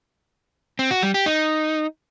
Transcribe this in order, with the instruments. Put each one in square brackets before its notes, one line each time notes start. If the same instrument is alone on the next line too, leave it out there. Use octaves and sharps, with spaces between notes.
[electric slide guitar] C4
F#4
G3
G4
D#4